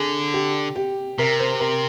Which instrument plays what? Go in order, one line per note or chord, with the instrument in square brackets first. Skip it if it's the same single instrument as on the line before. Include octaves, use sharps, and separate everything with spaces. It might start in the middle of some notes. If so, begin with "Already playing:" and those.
Already playing: [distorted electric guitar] D3 [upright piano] G#4
[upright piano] G4
G4
[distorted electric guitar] C3 [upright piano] A#4
[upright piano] C5
A#4